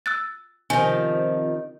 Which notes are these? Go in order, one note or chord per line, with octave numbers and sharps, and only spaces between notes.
E6 F#6 A6
C3 D#3 F3 G#5